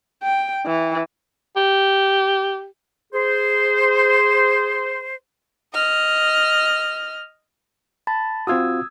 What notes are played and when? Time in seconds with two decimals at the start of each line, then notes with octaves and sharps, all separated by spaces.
0.23 G5
0.66 E3
1.57 G4
3.13 G#4 C5
5.74 D#5 F6
8.07 A5 B5 A6
8.47 C4 F4 F#4 D#6 E6 G#6